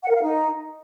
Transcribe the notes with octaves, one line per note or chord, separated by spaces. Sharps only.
F#5
A#4
F5
D#4